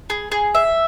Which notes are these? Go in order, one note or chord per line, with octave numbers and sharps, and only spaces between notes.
G#4
G#4
E5